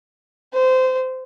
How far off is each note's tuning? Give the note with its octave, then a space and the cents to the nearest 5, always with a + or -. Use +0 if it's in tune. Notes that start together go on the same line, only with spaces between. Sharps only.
C5 -20